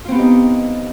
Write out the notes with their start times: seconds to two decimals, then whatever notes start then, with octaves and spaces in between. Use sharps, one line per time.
0.05 F4
0.08 C4
0.12 B3
0.15 G4
0.19 D#4